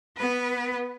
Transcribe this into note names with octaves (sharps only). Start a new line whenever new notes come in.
B3 B4